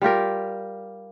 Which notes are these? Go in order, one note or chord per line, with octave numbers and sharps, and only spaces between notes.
G3 F4 G4 A#4